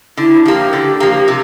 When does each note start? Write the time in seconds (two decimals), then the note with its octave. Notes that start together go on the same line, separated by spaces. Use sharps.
0.17 D3 E4
0.46 F3 A#3 G4
0.73 D3
1.00 F3 A#3
1.28 C3